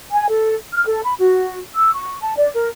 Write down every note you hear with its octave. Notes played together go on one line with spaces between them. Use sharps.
G#5
A4
F6
A4
B5
F#4
E6
C#6
A5
D5
A#4